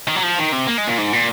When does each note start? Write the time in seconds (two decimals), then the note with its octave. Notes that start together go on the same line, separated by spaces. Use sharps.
0.08 D#3
0.15 F#3
0.23 F3
0.38 D#3
0.52 C3
0.67 A#3
0.78 G#3
0.87 A#2
0.98 G#2
1.13 A#2